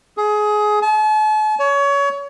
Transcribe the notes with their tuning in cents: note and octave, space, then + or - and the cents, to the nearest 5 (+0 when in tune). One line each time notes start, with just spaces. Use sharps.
G#4 +20
A5 -45
C#5 +25